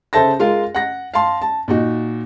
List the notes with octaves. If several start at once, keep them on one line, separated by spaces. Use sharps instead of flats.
C#3 A4 C5 E5 A5 A#6
G#3 F4 A#4 F5
F#5 A#6
F5 A5 C6
A5
A#2 D#4 F#4